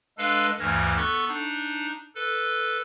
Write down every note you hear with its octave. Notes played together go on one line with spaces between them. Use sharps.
G#3 D4 A4 B4 F5
D2 G2 E3 F6 G#6 A#6
B3 A4 C#6 F#6
D4 D#4
A4 B4